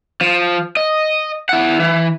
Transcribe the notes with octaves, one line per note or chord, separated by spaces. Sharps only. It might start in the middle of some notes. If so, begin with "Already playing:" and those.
F3
D#5
E4 F#5
E3